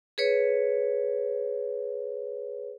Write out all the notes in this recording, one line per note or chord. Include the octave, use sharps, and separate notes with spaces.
G#4 B4 C#5